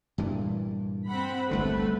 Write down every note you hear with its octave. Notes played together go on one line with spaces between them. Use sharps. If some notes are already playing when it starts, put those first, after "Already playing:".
G2 A#2 E3
C4 F#5 B5
G1 C2 D3 A3 B4